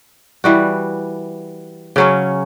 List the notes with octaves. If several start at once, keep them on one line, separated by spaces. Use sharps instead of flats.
E3 G3 F#4
C#3 F#3 C#4